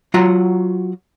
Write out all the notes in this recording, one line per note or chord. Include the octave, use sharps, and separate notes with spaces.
F#3 F4 F#4 F#5 A#5